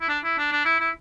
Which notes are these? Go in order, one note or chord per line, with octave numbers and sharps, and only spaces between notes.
E4
D4
E4
D4
D4
E4
E4